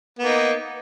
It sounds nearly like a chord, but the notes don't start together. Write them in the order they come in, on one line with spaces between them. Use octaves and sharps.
B3 A#3 D#4